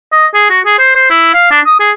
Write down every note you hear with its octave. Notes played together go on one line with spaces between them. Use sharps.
D#5
G#4
F#4
G#4
C5
C5
E4
F5
D4
D#6
G#4